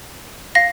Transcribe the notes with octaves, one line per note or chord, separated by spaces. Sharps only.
F5 A#6